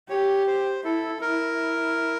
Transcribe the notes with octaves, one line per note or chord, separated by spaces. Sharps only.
G4 C#5
C5
E4 A4
E4 A#4